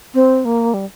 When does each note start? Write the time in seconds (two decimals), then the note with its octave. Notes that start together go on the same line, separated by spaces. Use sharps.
0.14 C4
0.45 A#3
0.74 G3